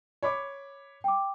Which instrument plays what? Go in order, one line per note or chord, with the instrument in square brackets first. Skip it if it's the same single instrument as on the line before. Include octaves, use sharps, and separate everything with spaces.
[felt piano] C#5 B5 D6
[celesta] G5 D6